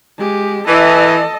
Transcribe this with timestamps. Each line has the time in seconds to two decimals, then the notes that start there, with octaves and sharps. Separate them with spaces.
0.18 G#3 G4
0.68 E3 A4 D#5